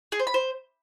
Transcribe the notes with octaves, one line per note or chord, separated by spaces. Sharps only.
G#4
C5
B5
C5